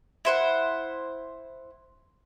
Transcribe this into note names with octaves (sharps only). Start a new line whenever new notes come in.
E4 C5 F#5